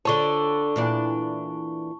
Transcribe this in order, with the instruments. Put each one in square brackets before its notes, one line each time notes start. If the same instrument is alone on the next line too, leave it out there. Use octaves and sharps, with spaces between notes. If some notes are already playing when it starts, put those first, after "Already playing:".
[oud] D3 F4 C#5 [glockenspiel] A5 C#6 G7
[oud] A#2 E3 D4